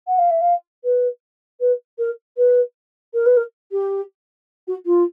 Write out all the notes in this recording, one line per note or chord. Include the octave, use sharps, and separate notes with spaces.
F#5
F5
E5
F5
B4
B4
A#4
B4
A#4
B4
A#4
G4
F#4
F4